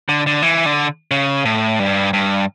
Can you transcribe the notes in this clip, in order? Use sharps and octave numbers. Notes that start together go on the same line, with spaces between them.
D3
D3
E3
D3
C#3
A2
G2
G2